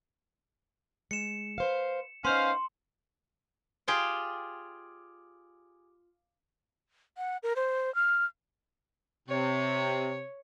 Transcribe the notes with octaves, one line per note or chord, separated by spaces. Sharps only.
G#3 C#7 E7
B4 C5 F5
B3 C#4 D#4 C5 F5 C6
F4 G4 G#4 D5 G5
F#5
A#4
C5
F6
C3 C#5